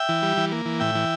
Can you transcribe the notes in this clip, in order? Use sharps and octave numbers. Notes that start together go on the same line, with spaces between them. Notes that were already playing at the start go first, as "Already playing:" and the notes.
Already playing: E5 G5
E3
G3
E3
A#3
E3
A2 E5 G5
E3